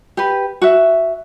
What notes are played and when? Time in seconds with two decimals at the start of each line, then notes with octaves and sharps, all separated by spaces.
0.17 G4 B4
0.61 F#4 E5